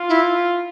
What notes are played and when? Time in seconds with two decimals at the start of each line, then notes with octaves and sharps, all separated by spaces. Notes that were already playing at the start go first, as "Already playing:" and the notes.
Already playing: F4
0.09 E4